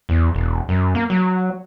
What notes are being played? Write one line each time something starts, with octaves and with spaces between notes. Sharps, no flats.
E2
E1
F#2
A#3
F#3